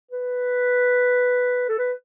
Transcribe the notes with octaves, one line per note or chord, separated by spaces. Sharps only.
B4
A4
B4